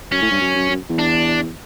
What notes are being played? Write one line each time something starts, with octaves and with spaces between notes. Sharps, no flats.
F#2 C#4
A2
G2
F#2
F#2
F#2
E2
D4